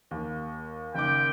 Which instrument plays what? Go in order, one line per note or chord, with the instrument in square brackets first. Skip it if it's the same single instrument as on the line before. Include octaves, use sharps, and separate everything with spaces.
[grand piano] D#2
[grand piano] F#1 D#3 D6 [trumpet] G5